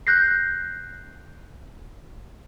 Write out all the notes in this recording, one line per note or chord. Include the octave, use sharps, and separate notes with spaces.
F#6 G6 A#6 C7